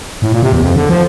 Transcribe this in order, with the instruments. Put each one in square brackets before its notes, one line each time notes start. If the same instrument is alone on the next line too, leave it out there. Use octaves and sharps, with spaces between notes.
[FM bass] A2
A#2
C3
E2
F2
D3
F3